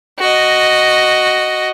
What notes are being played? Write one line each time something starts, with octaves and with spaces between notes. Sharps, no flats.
F#4 D#5